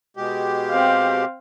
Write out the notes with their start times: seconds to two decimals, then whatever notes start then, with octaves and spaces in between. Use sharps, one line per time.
0.17 B2 G#3 G4
0.70 C4 F5